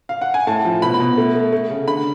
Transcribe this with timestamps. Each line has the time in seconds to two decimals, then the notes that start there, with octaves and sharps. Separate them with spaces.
0.09 F5
0.21 F#5
0.34 G#5
0.47 A2 A5
0.65 F3
0.82 B2 B5
0.94 B5
1.00 B2
1.17 A3
1.35 A3
1.52 A3
1.70 C#3
1.88 D3 B5